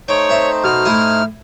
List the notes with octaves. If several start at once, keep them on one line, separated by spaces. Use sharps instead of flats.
A3 D#4 C5 C#5 G5
C4 E5
B2 F6
A2 E4 D#6